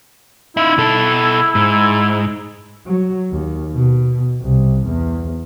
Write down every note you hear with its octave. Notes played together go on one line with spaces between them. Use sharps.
D#4 E4 E5
B2 A4
G#2
F#3
D#2
B2
C2
E2